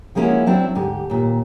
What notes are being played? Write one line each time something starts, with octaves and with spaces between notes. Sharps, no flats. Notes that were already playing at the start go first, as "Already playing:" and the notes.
F3 G#3 A#3 C#4 E4 F#4
F#3 C4 D4 E4
D2 G#2 G4
D#2 A#2